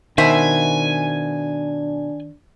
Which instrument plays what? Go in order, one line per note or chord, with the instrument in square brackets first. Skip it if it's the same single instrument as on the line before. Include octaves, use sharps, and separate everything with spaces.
[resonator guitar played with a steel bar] B2 C5 E5 [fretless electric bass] D#3 [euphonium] D4 [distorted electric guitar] G#5